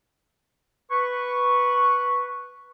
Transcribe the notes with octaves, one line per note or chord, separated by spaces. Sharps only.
B4 C#6